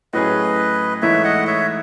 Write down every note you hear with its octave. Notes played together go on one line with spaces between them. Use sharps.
A2 F#3 C#4 G#4 B4 D#5
G#2 E3 A3 E4 C#5 E5
D#5 F#5
C#5 E5